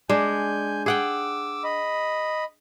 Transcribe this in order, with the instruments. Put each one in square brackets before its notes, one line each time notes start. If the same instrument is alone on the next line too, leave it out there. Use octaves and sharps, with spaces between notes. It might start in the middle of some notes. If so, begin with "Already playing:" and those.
[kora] G#3 D4 [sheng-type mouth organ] G#5 G6
[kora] G#4 F#5 G5 [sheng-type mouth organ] D6 E6
[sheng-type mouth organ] D#5 B5